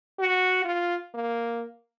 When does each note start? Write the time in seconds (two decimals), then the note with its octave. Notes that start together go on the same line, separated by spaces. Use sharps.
0.19 F#4
0.65 F4
1.14 A#3